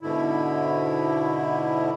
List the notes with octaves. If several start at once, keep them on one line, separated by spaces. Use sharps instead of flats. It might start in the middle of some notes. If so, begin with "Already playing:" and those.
G#2 B2 D3 E4